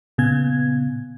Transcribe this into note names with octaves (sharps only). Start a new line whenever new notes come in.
A#2 C#3 B3 G#6